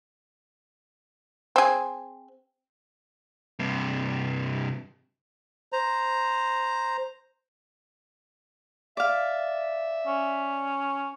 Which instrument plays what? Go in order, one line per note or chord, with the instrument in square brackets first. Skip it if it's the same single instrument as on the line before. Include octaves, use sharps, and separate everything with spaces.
[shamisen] C4 G#4
[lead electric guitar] G2 C3
[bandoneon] C5 A#5
[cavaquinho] D5 F5 [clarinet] E5
[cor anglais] C#4